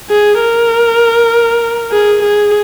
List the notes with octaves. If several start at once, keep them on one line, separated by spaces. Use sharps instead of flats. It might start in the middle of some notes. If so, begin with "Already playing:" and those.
G#4
A#4
G#4
G#4